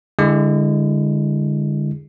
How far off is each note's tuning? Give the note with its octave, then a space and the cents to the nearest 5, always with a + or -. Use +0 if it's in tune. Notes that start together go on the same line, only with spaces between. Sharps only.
D3 +0 G#3 -25 E4 +0